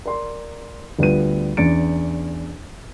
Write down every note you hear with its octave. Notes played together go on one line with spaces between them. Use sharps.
A#4 D5 C6
D2 G3 B3 F4 D#7
E2 C#4 D4 A6 C#7 D7